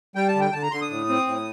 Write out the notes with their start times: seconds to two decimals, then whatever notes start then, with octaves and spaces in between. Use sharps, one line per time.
0.15 G3 G5
0.28 A5
0.35 D3
0.40 G5
0.53 D3 A5
0.63 A#5
0.71 D3 C6
0.82 D#6
0.90 A2
1.09 C4
1.27 A2